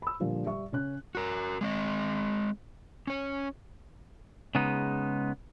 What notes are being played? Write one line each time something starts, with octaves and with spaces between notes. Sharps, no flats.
B5 E6
A#2 D3 F3 G3 F4
G3 E5 C#6
C#3 C#4 F#6
F#4 A#4
G#3 C4 D#5
C#4 C#5
C#3 G#3 B3 D#4